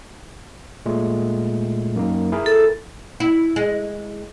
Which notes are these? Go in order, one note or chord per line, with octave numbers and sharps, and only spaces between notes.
A#2 G#3 A3
F#2 A#3 D#4
E4 G#4 A#4
A4
E4
G#3